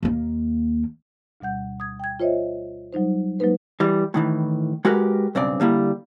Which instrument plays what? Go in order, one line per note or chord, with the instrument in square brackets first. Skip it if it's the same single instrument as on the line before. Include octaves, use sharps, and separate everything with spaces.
[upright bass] D#2 A#3
[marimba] D2 B2 G3 F#5 G6
D#6 G#6
G5 G#6
F4 C5 C#5 D#5 E5
F#3 G3 D#4 C5
F#3 G#3 A#3 D#4 B4 C5
[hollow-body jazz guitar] E3 G3
A2 D#3 E3
G#3 F#4 G4 A#4 B4
B1 G2 C#3 C4 D5
D3 G3 A#3 E4